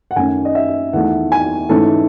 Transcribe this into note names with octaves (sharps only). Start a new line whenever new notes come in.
F#5
F#2 D#3 A3 C#4 G#5
D#5
E5
E2 D#3 A3 F#5
G#5
G#2 E3 A3 C#4 A4